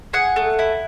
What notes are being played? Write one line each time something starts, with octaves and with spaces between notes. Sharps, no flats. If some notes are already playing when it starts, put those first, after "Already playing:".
G#4 F#5
A3
E4